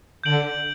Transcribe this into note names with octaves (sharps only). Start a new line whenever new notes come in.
D3 G6 D7 F#7